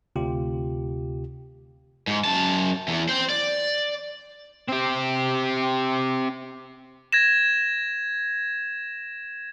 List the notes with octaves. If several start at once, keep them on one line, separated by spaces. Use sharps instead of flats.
D2 C3 F4 G4
G#2
F#2 A5
E2
C5 G5
D5
C4 G4
G#6 A#6 E7